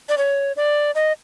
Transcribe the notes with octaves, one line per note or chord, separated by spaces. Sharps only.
D5
C#5
D5
D#5